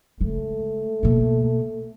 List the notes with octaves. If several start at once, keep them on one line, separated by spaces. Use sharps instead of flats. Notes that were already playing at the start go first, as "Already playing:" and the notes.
C#3 G#3 A3
B2 A#3